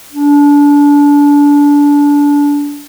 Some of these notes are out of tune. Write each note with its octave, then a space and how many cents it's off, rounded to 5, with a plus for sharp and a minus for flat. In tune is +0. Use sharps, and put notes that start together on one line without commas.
D4 -25